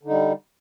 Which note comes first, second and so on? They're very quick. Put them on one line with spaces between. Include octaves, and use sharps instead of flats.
D3 D#4 G3